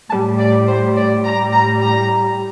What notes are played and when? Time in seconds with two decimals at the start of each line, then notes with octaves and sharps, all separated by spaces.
0.10 A2 G3 A5
0.39 D5
0.68 C5
0.96 D5
1.24 A2 G3 A#5
1.53 A#5
1.81 A#5